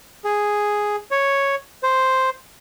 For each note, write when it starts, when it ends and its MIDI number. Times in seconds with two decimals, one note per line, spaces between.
0.24 0.96 68
1.11 1.55 73
1.83 2.30 72